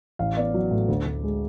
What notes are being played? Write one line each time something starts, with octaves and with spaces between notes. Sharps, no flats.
A1 F5
B3 D5
F#3
A2
D2
D2
G#3